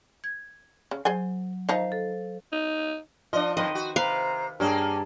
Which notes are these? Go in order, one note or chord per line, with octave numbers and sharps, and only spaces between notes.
G#6
C#3
F#3 G#4 C5 G#5
D#3 F3 D#4 C5 F5
A4
D#4
F3 D4 D#5
F2 D#3 F3 B4 C5 D#5
F#4
C3 B4 C5 F5 A#5
G2 A#3 C#4 G#4 G5 A5 A#5